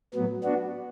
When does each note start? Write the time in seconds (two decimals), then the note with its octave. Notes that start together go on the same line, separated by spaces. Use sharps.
0.14 A2 F#3 B3
0.44 B3 D4 F#4